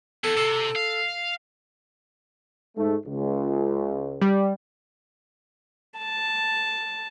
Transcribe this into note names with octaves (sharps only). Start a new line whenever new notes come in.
E2 A4
C3 A4
F5
G#2 A3
C#2
G3
A5